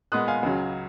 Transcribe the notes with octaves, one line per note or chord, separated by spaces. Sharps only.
A#2 G#3 B3 D#6 F#6
F5 G#5
C#2 C#3 F#3